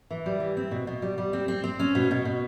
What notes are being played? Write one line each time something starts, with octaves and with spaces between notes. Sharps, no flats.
E3
G3
E3
C4
B2
B2
G3
G3
C4
C4
C4
C#4
B2
B2
B2